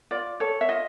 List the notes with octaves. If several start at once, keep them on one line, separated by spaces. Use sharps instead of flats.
F4 D5
A4 C#5
E5
F4 D#5